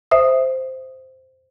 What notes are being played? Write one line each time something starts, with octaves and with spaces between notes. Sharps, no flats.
C5 E5 D#6